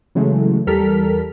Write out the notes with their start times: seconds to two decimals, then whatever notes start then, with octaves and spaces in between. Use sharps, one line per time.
0.15 C#3 E3 F#3 G#3 A3
0.67 E2 G3 A4 A#4 F6 B6